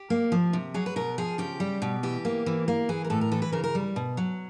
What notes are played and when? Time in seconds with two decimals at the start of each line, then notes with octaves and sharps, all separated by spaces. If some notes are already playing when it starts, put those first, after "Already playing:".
Already playing: G4
0.10 A#3
0.32 F3
0.53 C3
0.74 F#3 G#4
0.86 B4
0.96 B2 A#4
1.18 F3 G#4
1.38 C#3 G4
1.60 G3
1.82 B2
2.03 E3 G4
2.25 A#3
2.46 E3
2.68 A#3
2.89 E3 G#4
3.04 A#4
3.10 A2 A4
3.21 A#4
3.32 E3 A4
3.42 B4
3.52 C#3 A#4
3.64 A#4
3.75 G3
3.96 B2
4.17 F#3